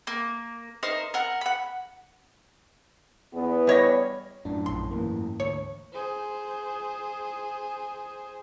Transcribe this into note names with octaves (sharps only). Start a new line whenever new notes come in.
A#3
D#4 A#4 C5
A#4 F#5
F#5 B5
E2 B3
G3 C#5 D#5
F#2 A2 D4
A#1 C6
G#2 E3 A#3
D2 C#5
G#4 C5